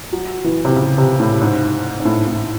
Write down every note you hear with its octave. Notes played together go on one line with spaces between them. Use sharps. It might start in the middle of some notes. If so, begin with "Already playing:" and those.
F#3
E3
C3
C#3
C3
A2
G#2
G#2
A2
A2